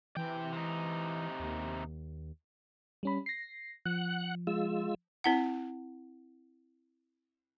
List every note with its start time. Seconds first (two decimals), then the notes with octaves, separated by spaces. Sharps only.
0.17 C3 E3 G5
0.52 C3 D#4
1.40 D#2
3.03 G3 C#4 B5
3.26 A#6 C7
3.86 F3 F#5 F#6
4.47 G#3 F4 E6
5.24 C4 E4 F#5